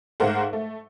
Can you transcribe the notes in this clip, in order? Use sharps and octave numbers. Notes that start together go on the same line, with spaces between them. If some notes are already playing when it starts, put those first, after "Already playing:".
G#2 A3 A#4 C5 F5 F#5
A3